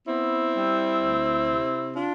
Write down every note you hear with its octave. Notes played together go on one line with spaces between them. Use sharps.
B3 C4 E4
G3
D2
C3
D4 F4